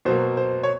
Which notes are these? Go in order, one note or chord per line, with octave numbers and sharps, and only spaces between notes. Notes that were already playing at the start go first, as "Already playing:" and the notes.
B2 F#3 A#3 C5
C5
C#5